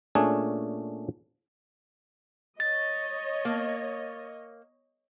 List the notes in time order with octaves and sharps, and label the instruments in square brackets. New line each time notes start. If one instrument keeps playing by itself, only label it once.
[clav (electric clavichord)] A#2 A3 C#4 D4 G#4
[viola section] C#5 D#5 [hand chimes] A6
[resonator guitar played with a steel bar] A#3